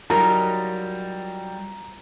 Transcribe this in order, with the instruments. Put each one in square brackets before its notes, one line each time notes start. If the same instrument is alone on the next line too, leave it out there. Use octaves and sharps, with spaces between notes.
[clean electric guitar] F#3 G3 D#4 [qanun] F4 A#4 [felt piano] A#5